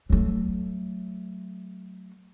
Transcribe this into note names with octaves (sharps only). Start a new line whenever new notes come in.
F#3 A3